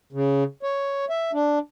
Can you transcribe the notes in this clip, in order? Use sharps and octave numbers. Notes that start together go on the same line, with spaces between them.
C#3
C#5
E5
D4